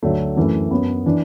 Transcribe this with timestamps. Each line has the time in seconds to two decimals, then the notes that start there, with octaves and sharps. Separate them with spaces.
0.03 D2 D3 F#3 A3
0.37 F#2 E3 A3
0.71 F#2 F#3 B3
1.06 E3 D4